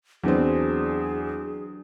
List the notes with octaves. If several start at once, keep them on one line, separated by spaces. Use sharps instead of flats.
E2 F#3 C4 D4 G#4 B4